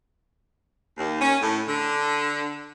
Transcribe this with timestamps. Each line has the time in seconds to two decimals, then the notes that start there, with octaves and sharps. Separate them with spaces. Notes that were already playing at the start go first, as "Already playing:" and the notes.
0.98 D#2
1.20 C#4
1.41 A2
1.68 D3